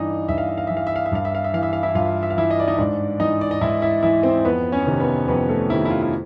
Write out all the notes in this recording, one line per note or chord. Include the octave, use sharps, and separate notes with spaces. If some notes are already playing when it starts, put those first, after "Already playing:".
Already playing: G2 E3 D4 D#4 D#5
G2 E5
F5
E5
F5
E3 E5
F5
E5
F5
E5
G2 F5
E5
F5
E5
E3 F5
E5
F5
E4 E5
G2 F4 F5
E5
F5
E3 E4 E5
D#5
D5
D#4 D#5
G#2 D4 D5
E3 D#4 D#5
D5
D#5
G#2 E4 E5
E4 E5
E3 E4 E5
C4 C5
F2 B3 B4
C#4 C#5
C3 D#3
B3 B4
F2 B3 B4
A3 A4
C3 D#3 E4
E4
F4
E4